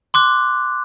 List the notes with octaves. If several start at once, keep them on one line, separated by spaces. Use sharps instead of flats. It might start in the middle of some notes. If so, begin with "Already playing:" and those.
C6 D6 F#6